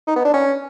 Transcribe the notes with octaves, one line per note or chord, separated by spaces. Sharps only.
D#4
B3
D4
C#4